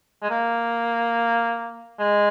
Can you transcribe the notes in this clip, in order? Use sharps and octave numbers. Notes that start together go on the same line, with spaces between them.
G#3
A#3
G#3